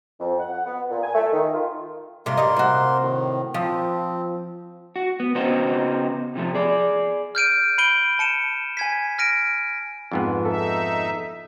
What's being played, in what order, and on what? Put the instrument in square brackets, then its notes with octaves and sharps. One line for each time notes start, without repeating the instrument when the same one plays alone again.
[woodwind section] F2
F#5
F#5
B3
A#2
G#5
A3
D#3
F4
[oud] G2 C3 [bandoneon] A#3 A#4 C6
[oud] G3 D#5
C3 F#4
[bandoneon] A2 D#3
[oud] F3 [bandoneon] C4
[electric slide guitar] F#4
B3
C#3 B3 C4 D#4 F#4 C5
C3 F3 A3
G#4 D5
[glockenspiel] F6 G6 D7 D#7
B5 G6 C7 D7 D#7 G7
A5 C#7 D#7 E7
G#5 G#6 B6
F6 A#6 D7 D#7
[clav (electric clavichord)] F2 G#2 B3
[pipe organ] D#4 E5 [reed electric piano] A4